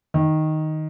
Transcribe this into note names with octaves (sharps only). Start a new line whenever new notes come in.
D#3